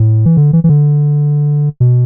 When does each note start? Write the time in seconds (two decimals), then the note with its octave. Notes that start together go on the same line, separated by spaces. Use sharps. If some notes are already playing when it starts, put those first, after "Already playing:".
Already playing: A2
0.26 E3
0.37 D3
0.53 E3
0.64 E3
0.69 D3
1.80 B2